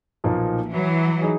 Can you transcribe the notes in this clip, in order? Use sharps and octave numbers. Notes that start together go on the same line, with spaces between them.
B1 A#2 F3 A#3 D#4
E3 F#3
D#4 G#4